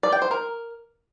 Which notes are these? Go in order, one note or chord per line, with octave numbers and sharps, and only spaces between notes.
D5
G5
C5
A#4